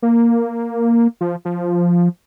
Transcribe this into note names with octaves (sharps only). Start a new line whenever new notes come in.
A#3
F3
F3